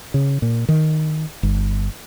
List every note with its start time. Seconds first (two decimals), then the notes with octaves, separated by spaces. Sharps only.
0.14 C#3
0.42 A#2
0.69 D#3
1.43 G1